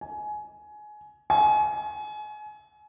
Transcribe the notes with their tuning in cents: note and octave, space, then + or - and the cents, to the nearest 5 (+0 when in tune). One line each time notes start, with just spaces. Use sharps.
G#5 +20
G#5 +30